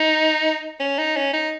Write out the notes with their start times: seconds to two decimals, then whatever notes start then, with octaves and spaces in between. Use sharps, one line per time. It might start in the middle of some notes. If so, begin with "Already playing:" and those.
Already playing: D#4
0.80 C#4
0.98 D#4
1.17 C#4
1.33 D#4